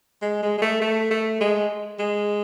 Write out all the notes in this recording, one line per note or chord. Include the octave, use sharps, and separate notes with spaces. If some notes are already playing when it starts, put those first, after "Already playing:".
G#3
G#3
G#3
A3
A3
A3
G#3
G#3